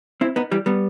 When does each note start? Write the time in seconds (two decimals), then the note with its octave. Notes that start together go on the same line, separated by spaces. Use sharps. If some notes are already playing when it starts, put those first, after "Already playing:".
0.21 C4 E4
0.36 B3 D#4
0.51 E3 G3
0.66 G3 B3